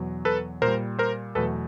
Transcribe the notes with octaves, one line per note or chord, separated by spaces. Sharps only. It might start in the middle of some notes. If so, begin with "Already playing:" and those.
Already playing: E2 B2 F#3
A4 B4
A#2 G3 A#4 C5
A#4 C5
E2 B2 F#3 A3 A4 B4